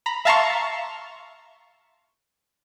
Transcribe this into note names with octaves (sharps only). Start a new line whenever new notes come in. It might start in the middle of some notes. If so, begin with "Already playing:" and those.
A#5 B5
E5 F5 A5 A#5 C6 C#6